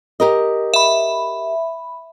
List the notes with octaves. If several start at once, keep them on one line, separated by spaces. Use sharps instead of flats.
G4 A#4 D#5
E5 B5